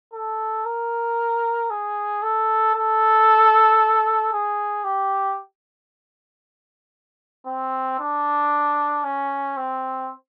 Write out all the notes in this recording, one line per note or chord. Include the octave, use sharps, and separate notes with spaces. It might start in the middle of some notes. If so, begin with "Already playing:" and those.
A4
A#4
G#4
A4
A4
G#4
G4
C4
D4
C#4
C4